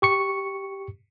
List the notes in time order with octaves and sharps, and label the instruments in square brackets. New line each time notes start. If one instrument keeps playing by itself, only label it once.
[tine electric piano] G4 C#6 C#7